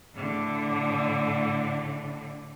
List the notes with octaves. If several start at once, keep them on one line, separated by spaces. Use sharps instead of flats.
A2 D3